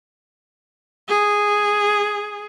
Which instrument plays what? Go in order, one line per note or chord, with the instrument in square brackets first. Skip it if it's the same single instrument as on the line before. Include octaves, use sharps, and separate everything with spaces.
[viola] G#4